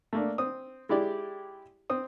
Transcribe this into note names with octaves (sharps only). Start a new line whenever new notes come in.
A3 A#3 D4
C4 D#6
G#3 E4 G4 D5
C4 D#6